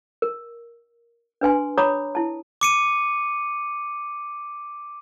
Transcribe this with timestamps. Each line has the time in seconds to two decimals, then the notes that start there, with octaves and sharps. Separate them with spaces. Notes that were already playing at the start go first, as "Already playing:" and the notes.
0.22 A#4
1.41 D4 B4 G#5 C6
1.78 C#5 A#5 B5 D6 D#6
2.15 E4 A5
2.61 D6 C#7 D#7